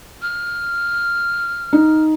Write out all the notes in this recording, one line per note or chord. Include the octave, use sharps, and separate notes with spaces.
F6
D#4